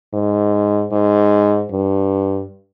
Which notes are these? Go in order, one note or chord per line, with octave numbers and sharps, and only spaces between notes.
G#2
G#2
G2